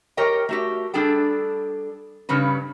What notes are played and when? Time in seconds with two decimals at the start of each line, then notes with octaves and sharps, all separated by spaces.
0.17 G4 A#4 C#5 D#5 G5
0.49 A3 F#4 G4
0.94 G3 D4 G#4 A4 G5
2.29 G2 C#3 G3 C#4 B4